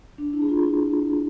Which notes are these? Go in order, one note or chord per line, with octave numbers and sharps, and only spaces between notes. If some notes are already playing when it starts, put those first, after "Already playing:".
D4
E4
G#4
F4